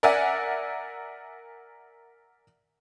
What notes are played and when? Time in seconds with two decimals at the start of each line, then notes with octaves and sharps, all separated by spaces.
0.03 A#4 D5 E5 F#5 G#5